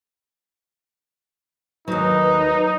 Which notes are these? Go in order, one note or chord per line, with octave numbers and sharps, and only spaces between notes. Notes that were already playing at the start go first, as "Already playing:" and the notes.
D#2 F#3 D#4 B4